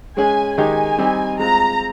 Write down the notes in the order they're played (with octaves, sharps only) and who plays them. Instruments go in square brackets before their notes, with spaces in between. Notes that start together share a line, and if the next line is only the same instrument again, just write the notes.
[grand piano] G#3 C#4 G#4 [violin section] G#5
[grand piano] D#3 G#3 D#4 G4 [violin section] G#5
[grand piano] G3 C4 D#4 G4
[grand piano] G#3 C4 F4 [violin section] A#5